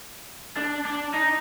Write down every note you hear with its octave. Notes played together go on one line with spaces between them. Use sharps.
D4
D4
D#4